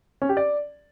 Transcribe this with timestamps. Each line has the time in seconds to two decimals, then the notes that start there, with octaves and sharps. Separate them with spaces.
0.22 C#4
0.29 G4
0.37 D5